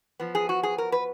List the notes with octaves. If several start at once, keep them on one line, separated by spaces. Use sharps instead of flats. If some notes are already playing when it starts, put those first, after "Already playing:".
F3 B3
G#4
F#4
G#4
A#4
B4